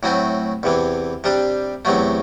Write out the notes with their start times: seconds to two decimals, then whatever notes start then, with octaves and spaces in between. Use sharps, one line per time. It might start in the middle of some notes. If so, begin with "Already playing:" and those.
0.03 A2 F#3 A3 C4
0.63 E2 C3 E3
1.24 C3 G3 D4
1.85 E2 C3 F#3 A3